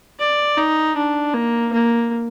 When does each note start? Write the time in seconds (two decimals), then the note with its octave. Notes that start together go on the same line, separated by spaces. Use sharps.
0.20 D5
0.57 D#4
0.96 D4
1.34 A#3
1.72 A#3